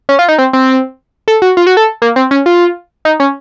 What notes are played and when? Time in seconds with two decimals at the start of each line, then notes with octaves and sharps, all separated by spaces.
0.09 C#4
0.19 F4
0.28 D#4
0.38 C4
0.53 C4
1.28 A4
1.42 F#4
1.57 F4
1.67 F#4
1.77 A4
2.02 A#3
2.16 C4
2.31 C#4
2.46 F4
3.05 D#4
3.20 C#4